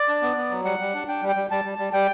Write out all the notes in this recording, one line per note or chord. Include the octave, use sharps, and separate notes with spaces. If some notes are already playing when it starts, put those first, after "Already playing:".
Already playing: D5
D4
B3
B3
F#3
G3 F#5
G3
D4
D4 G5
G3
G5
G3
G3 A5
G3
G3
G3 G5